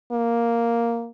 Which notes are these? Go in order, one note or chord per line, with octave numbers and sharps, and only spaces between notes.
A#3